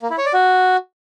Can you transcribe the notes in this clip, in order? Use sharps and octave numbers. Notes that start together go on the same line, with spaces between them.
A#3
E4
C#5
D5
F#4